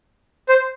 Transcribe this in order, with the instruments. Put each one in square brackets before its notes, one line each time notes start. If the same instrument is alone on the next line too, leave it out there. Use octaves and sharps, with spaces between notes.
[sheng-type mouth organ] C5